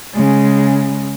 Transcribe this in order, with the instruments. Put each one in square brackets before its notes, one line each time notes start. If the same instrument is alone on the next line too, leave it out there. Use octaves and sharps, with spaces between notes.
[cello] C#3 G#3